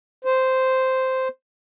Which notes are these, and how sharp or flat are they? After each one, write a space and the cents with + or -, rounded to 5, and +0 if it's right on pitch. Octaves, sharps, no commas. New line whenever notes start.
C5 -5